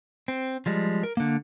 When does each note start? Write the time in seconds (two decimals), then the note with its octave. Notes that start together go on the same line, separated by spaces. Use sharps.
0.28 C4
0.66 F3 G3 G#3
1.03 A#4
1.17 D3 A#3